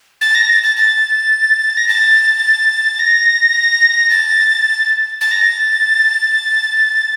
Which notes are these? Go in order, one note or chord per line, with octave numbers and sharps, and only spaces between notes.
A6
A#6
A6
A6
A6
A#6
A6
A#6
A6
A6
A#6
A6